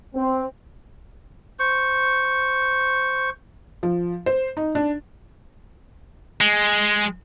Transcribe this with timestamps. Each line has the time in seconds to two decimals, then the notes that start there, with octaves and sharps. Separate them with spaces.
0.15 C4
1.59 C5 C#6
3.83 F3
4.26 C5
4.57 D#4
4.75 D4
6.41 G#3